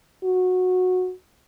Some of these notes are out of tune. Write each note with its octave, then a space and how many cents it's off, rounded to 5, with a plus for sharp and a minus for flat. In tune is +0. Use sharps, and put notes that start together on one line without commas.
F#4 -15